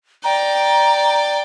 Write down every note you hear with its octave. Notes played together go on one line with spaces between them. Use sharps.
D5 G5 A#5